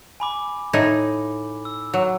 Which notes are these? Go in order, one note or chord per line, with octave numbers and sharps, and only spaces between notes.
G#5 B5 D6
A2 D#4 E4 B5
E6
F#3